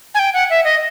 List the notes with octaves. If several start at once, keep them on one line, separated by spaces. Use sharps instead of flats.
G#5
G5
F#5
E5
D#5